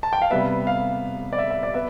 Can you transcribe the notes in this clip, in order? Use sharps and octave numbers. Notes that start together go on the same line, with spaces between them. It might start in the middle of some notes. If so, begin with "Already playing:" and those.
A5
G5
F5
C3 G3 B3 E5
F5
D5
E5
E5
D5
B3 E5